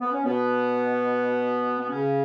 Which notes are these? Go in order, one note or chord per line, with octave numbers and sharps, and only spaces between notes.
B3
C#4
B2 B3
B3
C#3 C#4